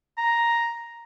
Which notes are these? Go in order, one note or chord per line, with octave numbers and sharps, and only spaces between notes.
A#5